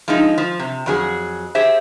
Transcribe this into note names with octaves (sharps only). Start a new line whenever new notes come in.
F3 G#3 D#4
F3
C3
F2 F#3 G#4
G4 G#4 C5 E5